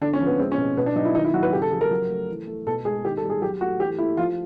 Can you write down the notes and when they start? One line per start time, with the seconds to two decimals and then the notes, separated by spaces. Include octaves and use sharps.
0.01 D3 D4
0.13 C#4
0.20 F3
0.26 B3
0.39 G#3 C4
0.52 C#4
0.58 B2
0.77 B2 B3
0.86 D4
0.96 F#3 D#4
1.05 E4
1.15 D#3 D#4
1.25 E4
1.34 F#3 F#4
1.43 B4
1.53 C#3 G4
1.62 A4
1.71 F3 G#4
1.81 A#4
1.91 F#3
2.10 A3
2.29 E3
2.47 A3
2.67 B2 A4
2.85 G#3 G#4
3.05 D#3 G4
3.17 A4
3.23 G3
3.30 G#4
3.42 F#3 G4
3.61 A3 F#4
3.80 E3 G4
3.98 A3 E4
4.17 F3 F4